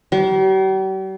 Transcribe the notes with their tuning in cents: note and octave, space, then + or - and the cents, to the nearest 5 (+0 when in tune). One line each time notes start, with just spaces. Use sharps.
G3 -45